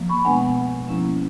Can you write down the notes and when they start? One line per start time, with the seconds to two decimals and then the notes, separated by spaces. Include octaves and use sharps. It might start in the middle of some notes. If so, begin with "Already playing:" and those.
Already playing: F3 A#3
0.09 B5 C#6
0.24 B2 G#3 B3 D4 F#5 G#5
0.88 F3 A#3 C#4 E4